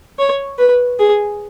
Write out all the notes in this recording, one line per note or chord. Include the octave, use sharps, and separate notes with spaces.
C#5
B4
G#4